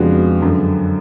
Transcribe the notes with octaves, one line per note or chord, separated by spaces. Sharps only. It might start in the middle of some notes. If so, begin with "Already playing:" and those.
Already playing: F2 C#3 G#3 B3 D4 F#4
F#2 D3 F#3